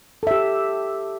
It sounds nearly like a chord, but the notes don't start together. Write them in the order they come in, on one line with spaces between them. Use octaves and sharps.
A4 E5 G4